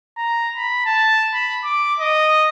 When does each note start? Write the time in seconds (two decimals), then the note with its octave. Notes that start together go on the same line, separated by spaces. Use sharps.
0.17 A#5
0.56 B5
0.86 A5
1.34 B5
1.64 D6
2.00 D#5